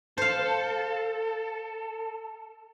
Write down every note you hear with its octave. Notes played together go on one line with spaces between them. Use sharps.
A4 C5 F5